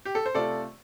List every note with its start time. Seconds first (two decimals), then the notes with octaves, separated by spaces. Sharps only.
0.05 G4
0.15 A4
0.26 C5
0.35 C3 A3 F4 A4 D5